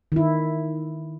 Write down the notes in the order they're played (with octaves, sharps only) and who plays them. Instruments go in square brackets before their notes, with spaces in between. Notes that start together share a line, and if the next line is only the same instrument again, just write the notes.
[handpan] D#3 E4